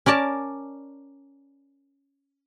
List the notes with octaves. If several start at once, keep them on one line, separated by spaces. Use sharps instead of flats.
C#4 A#4 D5 A5